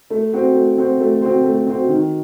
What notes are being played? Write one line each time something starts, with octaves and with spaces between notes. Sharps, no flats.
A3
C4 F#4 C5
A3
C4 F#4 C5
A3
C4 F#4 C5
A3
C4 F#4 C5
D#3